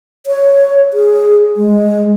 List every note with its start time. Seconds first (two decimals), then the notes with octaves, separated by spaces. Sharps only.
0.26 C#5
0.93 G#4
1.57 G#3